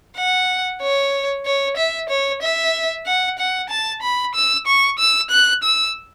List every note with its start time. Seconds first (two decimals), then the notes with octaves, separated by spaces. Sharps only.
0.17 F#5
0.81 C#5
1.45 C#5
1.77 E5
2.09 C#5
2.42 E5
3.06 F#5
3.38 F#5
3.70 A5
4.02 B5
4.35 E6
4.67 C#6
4.99 E6
5.31 F#6
5.64 E6